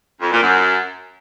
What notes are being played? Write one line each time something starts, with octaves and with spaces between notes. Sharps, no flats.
F2
A#2
F#2